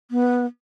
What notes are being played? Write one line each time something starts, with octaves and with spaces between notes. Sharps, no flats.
B3